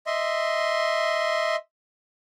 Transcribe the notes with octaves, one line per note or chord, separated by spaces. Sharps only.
D#5 E5 C6